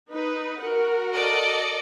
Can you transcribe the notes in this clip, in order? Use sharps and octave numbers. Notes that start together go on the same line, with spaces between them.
D#4 B4
F#4 A#4 F#5
A4 D5 D#5